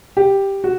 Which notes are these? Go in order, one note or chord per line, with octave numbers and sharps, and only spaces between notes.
G4
F#4